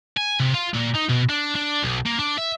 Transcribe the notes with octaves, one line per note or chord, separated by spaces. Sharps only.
G#5
C3
F4
A#2
D#4
B2
D4
D4
B1
A#3
D4
E5